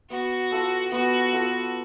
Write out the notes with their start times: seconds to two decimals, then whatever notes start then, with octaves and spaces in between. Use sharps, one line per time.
0.10 B3 F#4
0.51 F4 A4 F5
0.92 B3 F#4
1.33 F4 A4 F5